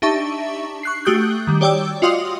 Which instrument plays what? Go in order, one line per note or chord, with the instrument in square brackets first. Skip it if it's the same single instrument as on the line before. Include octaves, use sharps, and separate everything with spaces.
[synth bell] D4 D#4 G4 E5 A5 C#6
C#6 F#6 C7
A3 F#4 G4 D#6 F#6 G6
D#3 G3
G4 C#5 D5 G5 D6 E6
F4 F#4 D#5 F5 C6 D#6